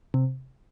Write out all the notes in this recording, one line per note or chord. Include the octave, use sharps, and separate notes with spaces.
C3